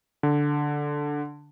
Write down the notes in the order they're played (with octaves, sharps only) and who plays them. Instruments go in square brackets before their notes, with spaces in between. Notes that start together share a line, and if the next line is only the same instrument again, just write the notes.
[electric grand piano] D3